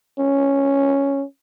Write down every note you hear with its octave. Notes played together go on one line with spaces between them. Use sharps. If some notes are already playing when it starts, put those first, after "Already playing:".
C#4